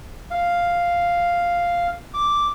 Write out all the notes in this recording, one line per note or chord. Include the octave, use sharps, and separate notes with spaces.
F5
D6